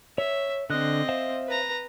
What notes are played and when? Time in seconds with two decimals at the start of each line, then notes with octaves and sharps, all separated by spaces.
0.18 C#5 E5
0.70 D3 C4 D#5 F#6
1.09 C5 E5 F5
1.47 B4 A#5